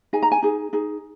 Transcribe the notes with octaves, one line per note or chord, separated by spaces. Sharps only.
D#4 G#4 G#5
A#5
G#5
D#4 G#4
D#4 G#4